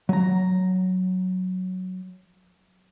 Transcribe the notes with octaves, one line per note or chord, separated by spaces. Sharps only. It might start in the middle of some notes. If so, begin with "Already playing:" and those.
F#3 A#5